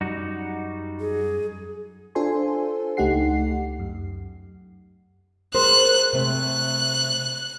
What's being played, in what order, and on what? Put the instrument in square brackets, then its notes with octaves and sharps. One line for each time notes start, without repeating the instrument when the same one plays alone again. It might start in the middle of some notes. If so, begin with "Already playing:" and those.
[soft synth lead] F#2 [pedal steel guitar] G3 D#4 F#4
[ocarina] G#4
[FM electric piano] D4 F4 A4 C5 G#5 C6
C#2 A3 D#4 G4 F#5 C7
F#2
[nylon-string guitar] G#4 A#4 C5 [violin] F#6
[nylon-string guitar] C3 A3 [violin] F#6